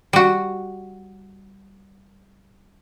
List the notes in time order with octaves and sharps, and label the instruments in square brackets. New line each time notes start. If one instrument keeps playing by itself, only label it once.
[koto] G3 F#4